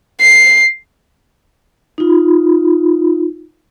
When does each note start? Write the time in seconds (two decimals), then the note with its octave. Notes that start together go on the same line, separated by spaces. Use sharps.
0.21 C7
1.98 D#4 F4